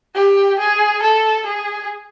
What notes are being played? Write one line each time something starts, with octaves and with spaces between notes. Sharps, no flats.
G4
G#4
A4
G#4